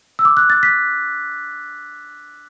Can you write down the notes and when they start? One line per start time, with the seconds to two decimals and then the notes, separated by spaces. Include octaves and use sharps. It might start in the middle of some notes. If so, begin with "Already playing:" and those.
0.19 E6
0.25 D6
0.37 F#6
0.50 A6
0.63 B6